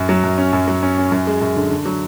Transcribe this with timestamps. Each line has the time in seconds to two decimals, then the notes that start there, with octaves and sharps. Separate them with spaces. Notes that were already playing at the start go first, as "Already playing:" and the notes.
Already playing: F#2
0.09 F#3
0.24 F#2
0.38 C#4
0.53 F#2
0.68 F#3
0.83 C#4
0.98 C#4
1.12 F#2
1.27 G#3
1.42 F#2
1.56 D3
1.71 D3
1.85 F#3